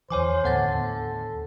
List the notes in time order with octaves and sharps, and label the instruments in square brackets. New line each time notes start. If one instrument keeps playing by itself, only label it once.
[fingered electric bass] E2 E3 [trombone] C5 [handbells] C#5 G#5 D6
[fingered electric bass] D#2 A2 D3 [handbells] B3 F#5 A6 [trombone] A4